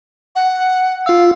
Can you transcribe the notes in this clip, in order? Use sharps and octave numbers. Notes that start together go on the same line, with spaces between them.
F#5
F4 F5 E6